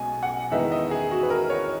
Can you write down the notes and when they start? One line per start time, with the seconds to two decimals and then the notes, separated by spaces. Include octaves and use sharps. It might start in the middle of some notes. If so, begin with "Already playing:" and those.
Already playing: B1 B2 G#3 D#4 G#5
0.23 F#5
0.51 E2 D#3 G#3 B3 D#4 E5
0.72 D#5
0.91 G#4
1.11 F#4
1.23 B4
1.30 A#4
1.50 C#5